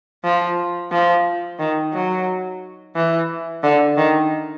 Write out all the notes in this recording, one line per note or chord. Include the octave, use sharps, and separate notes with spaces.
F3
F3
D#3
F#3
E3
D3
D#3